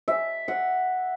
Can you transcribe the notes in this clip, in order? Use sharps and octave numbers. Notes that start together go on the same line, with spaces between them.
E5
F#5